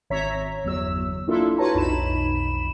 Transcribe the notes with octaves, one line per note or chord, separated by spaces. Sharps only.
G#1 C#5 E5 A#5 B6
G1 E2 F#3 E6
A#3 D4 E4 F4 A4 E5
F4 F#4 B4 C#5 A5 A#5
B1 F2 D#4 B5 E7